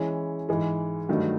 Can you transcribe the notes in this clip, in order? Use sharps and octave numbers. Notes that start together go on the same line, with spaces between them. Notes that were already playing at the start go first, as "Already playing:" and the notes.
Already playing: E3 G#3 C#4 E4
G#2 E3 G#3
G2 D#3 F#3 A3